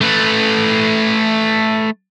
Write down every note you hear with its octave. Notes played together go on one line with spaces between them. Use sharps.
A3 B4